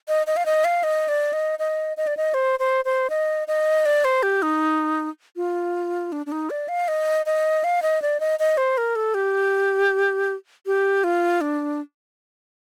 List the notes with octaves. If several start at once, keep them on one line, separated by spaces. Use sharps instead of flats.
D#5
D#5
F5
D#5
F5
D#5
D5
D#5
D#5
D#5
D5
D#5
C5
C5
C5
D#5
D#5
D5
C5
G4
D#4
F4
D4
D4
D#4
D5
F5
D#5
D#5
F5
D#5
D5
D#5
D#5
C5
A#4
A4
G4
G4
F4
D4